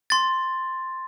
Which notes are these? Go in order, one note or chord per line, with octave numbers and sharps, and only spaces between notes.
C6 A6